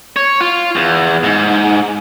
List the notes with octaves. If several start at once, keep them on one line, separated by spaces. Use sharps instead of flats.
C#5
F4
E2
G#2